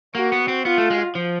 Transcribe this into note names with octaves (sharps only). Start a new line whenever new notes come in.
A#3 F#4
B3
C4
B3 F4
A3
G#3
F3